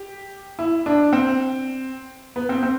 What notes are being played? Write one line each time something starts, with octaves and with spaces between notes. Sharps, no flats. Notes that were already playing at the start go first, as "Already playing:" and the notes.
Already playing: G4
E4
D4
C4
B3
C4
C4